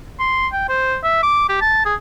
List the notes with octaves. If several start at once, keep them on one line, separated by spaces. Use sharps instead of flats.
C6
G5
C5
E5
D6
G4
A5
G#4